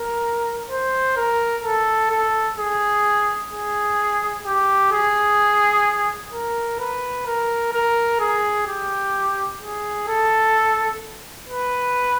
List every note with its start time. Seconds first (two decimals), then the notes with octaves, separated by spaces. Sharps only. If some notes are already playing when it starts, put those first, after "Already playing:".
Already playing: A#4
0.70 C5
1.17 A#4
1.64 A4
2.11 A4
2.58 G#4
3.51 G#4
4.45 G4
4.92 G#4
6.33 A#4
6.80 B4
7.26 A#4
7.73 A#4
8.20 G#4
8.67 G4
9.62 G#4
10.08 A4
11.49 B4